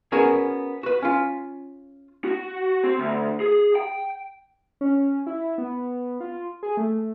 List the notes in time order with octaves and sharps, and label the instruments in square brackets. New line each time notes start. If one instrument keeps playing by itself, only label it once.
[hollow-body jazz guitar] B3 C#4 F#4 G#4 A#4
F#4 B4
C#4 F4
[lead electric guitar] F#4
C4
D2
G#4
G5
[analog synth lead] C#4
E4
B3
F4
G#4
A3